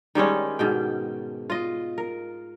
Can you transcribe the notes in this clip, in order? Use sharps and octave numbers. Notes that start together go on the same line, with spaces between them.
D#3 G3 G#3 C#4
G#2 B2 G5
F4 D#5
A#4